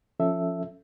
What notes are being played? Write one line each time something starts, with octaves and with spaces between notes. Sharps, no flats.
F3 C#4 A4 E5